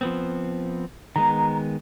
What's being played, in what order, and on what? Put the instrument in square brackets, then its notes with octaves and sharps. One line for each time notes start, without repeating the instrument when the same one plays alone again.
[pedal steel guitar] F3 B3 C4
[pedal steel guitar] D#3 G#3 B3 [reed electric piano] A#5